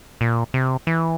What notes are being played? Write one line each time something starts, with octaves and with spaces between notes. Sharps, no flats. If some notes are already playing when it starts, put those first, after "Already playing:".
A#2
C3
E3